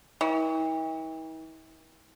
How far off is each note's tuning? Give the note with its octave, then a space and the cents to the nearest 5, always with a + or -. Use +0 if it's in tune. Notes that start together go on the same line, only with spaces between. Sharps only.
E3 -45